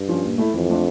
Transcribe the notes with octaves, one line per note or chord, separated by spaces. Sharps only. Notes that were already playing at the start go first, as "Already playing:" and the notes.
Already playing: G2
F3 C#4
A#2
A3 E4 A4
F2 E3
A3 D4 F4